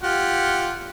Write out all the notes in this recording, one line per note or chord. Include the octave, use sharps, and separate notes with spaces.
F4 G4 F#5